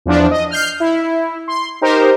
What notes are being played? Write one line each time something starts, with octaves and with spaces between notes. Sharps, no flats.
E2 F3 D4
D#5
F6 G6 C7
E4
C6
D#4 G4 A#4 C5